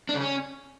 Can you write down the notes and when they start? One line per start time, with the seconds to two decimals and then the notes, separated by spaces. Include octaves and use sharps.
0.09 D4
0.15 C#3
0.21 C#4